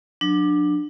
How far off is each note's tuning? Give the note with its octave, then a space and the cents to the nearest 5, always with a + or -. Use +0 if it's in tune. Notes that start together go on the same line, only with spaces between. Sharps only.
F#3 -30 D4 +15